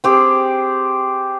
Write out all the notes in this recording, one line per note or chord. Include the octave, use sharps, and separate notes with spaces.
C4 G4 G#4